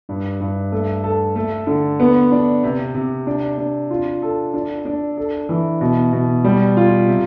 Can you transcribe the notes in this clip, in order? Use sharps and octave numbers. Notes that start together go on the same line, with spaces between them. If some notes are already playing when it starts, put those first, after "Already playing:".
G2
G2
A3
A4
A3
D3
B3
D4
C3
C3
D4
D4
F4
A4
D4
D4
A4
E3
B2
B2
G3
F4
C3